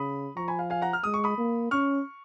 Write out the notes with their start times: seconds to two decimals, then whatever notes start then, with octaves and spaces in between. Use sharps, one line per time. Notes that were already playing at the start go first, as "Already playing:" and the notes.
Already playing: C#3 B5 D#6
0.37 F3 A#5 C#6
0.48 G#5 B5
0.59 F5
0.70 F5 G#5
0.82 F#5 A#5
0.93 F6
1.04 G#3 D#6
1.14 C#6
1.24 B5 D#6
1.38 A#3
1.71 C#4 C#6 F6